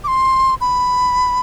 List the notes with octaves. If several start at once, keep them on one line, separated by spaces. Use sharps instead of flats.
D6
C6
B5